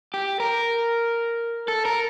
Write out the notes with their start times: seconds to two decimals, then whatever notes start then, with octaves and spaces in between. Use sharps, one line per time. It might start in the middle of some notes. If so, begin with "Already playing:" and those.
0.14 G4
0.40 A#4
1.68 A4
1.85 A#4